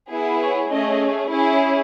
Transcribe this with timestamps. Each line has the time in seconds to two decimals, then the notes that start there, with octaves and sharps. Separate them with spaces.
0.11 B3 E4 G#4
0.42 C#5
0.71 A3 C#4 G#4 D#5
1.31 C#4 E4 G#4